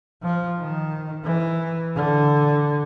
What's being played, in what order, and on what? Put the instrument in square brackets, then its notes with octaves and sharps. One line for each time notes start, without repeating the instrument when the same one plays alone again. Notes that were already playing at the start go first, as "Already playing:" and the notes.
[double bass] F3
D#3
E3
D3